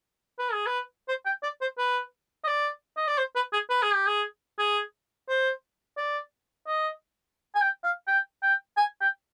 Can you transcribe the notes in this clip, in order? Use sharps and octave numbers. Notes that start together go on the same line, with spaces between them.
B4
G#4
B4
C5
G5
D5
C5
B4
D#5
D5
D#5
D5
C5
B4
G#4
B4
G#4
G4
G#4
G#4
C5
D5
D#5
G#5
G5
F5
G5
G5
G#5
G5